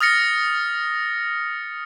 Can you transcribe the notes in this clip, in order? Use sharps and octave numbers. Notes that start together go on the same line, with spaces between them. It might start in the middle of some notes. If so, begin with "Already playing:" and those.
D#6 F6 A6 A#6 C#7